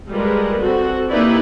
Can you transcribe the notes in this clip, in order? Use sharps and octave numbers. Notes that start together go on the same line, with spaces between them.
G3 G#3 F4 A#4 B4
C4 F#4 A4
A#3 D#4 E4 G4 B4 D5